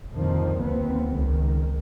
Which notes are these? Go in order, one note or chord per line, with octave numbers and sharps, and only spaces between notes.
G1 C2 F2 A#2 D#3 F3
D#2 F3 B3 C4
C#2 D#3